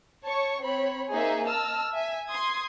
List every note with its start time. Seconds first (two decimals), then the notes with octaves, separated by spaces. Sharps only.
0.23 C#5 A5 C#6
0.62 C4 C#5 B5
1.10 A#3 D#4 G#4 C5 E5
1.46 D#5 A5 E6 F6
1.91 E5 G#5
2.27 C6 D#6 G#6